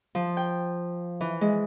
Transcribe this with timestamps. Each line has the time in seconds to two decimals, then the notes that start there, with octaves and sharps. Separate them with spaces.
0.15 F3
0.37 G5
1.21 E3
1.41 G#3